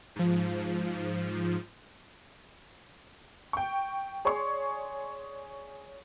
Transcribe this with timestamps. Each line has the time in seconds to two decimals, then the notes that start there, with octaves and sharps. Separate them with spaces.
0.16 G#2 F3
3.53 G5 C#6
4.25 G#4 C#5 D5 C6 C#6